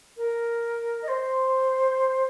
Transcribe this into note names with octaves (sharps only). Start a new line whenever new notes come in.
A#4
D#5
C5